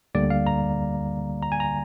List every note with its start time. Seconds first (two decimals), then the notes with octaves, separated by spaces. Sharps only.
0.15 D2 D3 G3 A#3 D5
0.30 F5
0.47 A#5
1.42 A#5
1.52 G#5
1.60 A#5